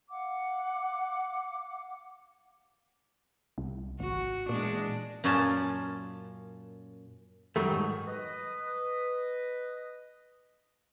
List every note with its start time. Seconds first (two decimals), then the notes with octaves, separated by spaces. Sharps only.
0.10 F5 F#5 D6
3.58 C2
4.00 G#1 F#4
4.49 E2 A#2 G#3 D4
5.24 F#2 A#2 C#4 A5
7.56 F#2 D#3 F#3 G3 A3
7.71 G#2
8.07 B4 D#5